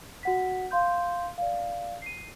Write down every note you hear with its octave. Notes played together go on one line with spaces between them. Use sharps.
F#4 F#5 B6
F5 C6 G6
D5 F5
C7 D#7